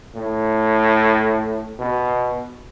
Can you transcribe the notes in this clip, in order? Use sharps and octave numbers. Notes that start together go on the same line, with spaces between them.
A2
B2